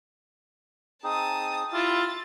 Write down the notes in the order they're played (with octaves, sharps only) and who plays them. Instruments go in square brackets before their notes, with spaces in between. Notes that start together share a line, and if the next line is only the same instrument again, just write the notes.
[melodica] C4 D#4 G#4 [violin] A5 D#6
[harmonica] E4 F4 [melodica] G4 [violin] A6